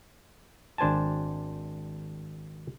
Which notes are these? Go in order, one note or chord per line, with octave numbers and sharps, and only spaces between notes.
G#1 D4 C5 G#5 A5